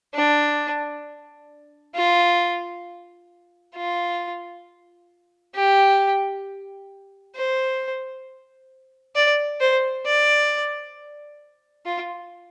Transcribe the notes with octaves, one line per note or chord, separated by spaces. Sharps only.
D4
F4
F4
G4
C5
D5
C5
D5
F4